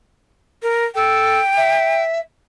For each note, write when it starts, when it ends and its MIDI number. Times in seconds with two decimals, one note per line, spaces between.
0.63 0.84 70
0.95 1.40 69
0.95 2.02 79
1.57 2.20 76